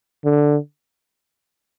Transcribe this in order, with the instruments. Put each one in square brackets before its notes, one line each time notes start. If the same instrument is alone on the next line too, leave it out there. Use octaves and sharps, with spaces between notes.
[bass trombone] D3